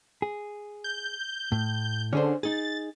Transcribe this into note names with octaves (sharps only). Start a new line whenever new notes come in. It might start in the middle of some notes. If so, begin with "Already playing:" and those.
G#4
G6
A2
D3 C#4 G#4 C5
D#4 G#4 A6